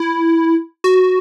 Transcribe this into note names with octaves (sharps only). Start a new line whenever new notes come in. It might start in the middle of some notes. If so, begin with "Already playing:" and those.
Already playing: E4
F#4